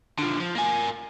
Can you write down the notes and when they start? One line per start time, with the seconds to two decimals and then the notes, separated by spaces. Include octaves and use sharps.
0.19 D3 F3
0.40 F3
0.55 A#3 G#5